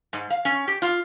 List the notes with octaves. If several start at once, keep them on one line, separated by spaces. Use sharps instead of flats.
G#2
F5
C#4
G4
F4